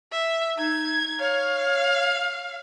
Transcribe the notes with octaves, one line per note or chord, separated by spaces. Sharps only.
E5
D#4 G#6
C#5 F5